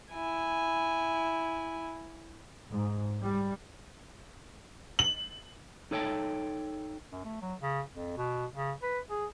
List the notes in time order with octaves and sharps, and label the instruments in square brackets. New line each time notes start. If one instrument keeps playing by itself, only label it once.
[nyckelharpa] E4 G#5
[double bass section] G#2
G3
[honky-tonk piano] F#7
[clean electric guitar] D#4 A4 C#5 D#5 G5 A5
[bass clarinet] F#2
A3
F#3
C#3
F2
B2
C#3
B4
G#4